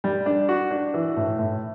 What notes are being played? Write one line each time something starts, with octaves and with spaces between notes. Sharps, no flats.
G3
D4
F#4
D4
E3
A2
A2